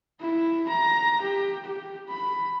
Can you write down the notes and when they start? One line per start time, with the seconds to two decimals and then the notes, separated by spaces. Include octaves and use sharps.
0.21 E4
0.69 A#5
1.22 G4
1.65 G4
2.09 B5